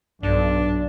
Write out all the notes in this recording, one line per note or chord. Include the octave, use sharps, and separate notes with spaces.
B1 G2 D4